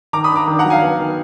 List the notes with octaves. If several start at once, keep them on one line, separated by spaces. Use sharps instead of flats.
D#3 A#5 D6
B5 D#6
D4
A#5 D6
D#3
F#5 A#5
F#3
F5 G#5
B3
D#3